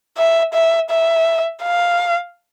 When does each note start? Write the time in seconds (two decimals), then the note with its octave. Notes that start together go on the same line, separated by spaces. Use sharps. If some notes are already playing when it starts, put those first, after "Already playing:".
0.17 E5
0.54 E5
0.90 E5
1.63 F5